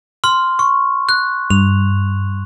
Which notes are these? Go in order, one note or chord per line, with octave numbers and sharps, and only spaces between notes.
C6 F6
C#6
F#6
G2 F7